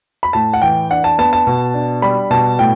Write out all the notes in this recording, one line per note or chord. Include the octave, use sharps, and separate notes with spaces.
B5
A2 A5
F#5
E3 G5
D4 F#5
A5
B3 A5
A5
B2
D4
G3 B5
B2 A5
A2 G5